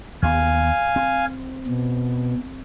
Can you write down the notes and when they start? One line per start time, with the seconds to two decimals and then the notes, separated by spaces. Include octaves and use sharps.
0.22 D#2 B3 F5 G#5
0.96 C4
1.67 B2